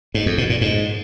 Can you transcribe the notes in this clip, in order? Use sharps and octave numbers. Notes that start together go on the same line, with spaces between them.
G#2
F2
B2
A#2
G#2